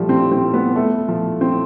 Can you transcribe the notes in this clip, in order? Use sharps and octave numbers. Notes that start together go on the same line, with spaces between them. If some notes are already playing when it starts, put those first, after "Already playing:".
Already playing: F3 G3 A3
C4
C4
B3
A3
F3
C4